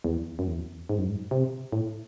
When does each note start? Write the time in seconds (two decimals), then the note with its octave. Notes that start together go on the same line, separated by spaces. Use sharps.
0.04 E2
0.39 F#2
0.47 E2
0.89 G#2
0.99 F#2
1.09 G#2
1.31 C3
1.72 A2